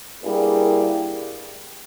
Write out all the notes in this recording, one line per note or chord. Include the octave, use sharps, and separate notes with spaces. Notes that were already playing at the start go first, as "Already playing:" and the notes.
G2 G3 A#3 E4 G#4